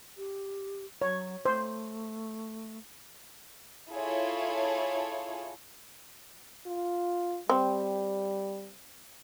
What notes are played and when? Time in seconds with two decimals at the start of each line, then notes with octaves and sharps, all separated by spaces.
0.17 G4
1.02 F#3 C#5
1.45 A3 C5
3.91 E4 F4 G#4 A4 C#5
6.67 F4
7.50 G3 C4